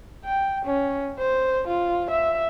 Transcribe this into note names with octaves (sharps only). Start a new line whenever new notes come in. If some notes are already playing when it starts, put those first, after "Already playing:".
G5
C#4
C5
F4
E5